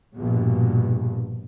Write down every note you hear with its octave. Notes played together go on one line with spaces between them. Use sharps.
A#1 G2 B2